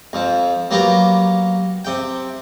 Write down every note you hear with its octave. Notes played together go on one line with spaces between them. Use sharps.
F2 F3
F#3 A#3 B3 G4
C3 G5